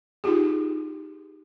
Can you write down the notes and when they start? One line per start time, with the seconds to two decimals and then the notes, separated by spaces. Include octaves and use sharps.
0.24 D#4 F4 G4 G#4